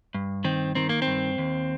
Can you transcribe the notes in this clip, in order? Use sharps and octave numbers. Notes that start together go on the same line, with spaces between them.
G2
D#3 C4
D#3 C4
A#3
C4
G2
D#2